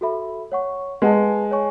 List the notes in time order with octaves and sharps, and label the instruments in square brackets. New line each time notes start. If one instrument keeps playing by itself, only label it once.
[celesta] F#4 A4 E5 B5
C#5 F#5 C#6
[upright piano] G#3 [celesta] B4 F#5 A5
[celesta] C#5 G#5 C#6